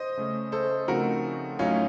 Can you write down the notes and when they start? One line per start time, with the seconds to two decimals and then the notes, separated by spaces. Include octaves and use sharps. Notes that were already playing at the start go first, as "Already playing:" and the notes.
Already playing: C5 D#5
0.17 C#3 A3 C#4
0.52 A4 C5
0.88 C#3 F3 A3 C4 D#4 F#4 A#4
1.59 A2 F#3 A3 C#4 D#4 F4